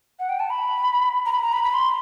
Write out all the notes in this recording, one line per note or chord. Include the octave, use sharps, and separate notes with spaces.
F#5
G5
A5
B5
A#5
B5
A#5
B5
B5
C6